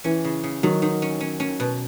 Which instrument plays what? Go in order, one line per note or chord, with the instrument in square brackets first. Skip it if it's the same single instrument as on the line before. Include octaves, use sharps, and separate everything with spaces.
[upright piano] E3 [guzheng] C#4
[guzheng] C#3
C#3
[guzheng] D#3 [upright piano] F#3
[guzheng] D#3
C#4
C#4
C#4
B2